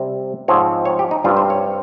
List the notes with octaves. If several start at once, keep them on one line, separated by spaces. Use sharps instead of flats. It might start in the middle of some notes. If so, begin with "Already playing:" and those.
Already playing: C3 G3 C4
G#2 F3 C4 C#5
C#5
G4
D#4
G2 G3 C4 F4
C5
C#5